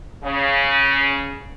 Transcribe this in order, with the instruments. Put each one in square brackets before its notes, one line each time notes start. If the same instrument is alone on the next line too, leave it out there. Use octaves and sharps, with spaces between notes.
[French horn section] C#3